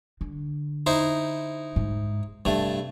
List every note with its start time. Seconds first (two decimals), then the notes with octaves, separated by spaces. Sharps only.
0.21 D3
0.87 D#4 E4 C5
1.76 G#2
2.45 G2 C3 A3